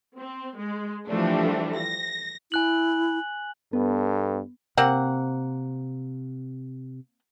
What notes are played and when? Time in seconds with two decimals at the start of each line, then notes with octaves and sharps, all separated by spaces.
0.17 C4
0.57 G#3
1.07 E3 F3 G3 A3 D4
1.76 A#6
2.52 E4 G#5 F#6 F#7
3.73 G2 B3 A4
4.77 C3 A#3 C4 F#5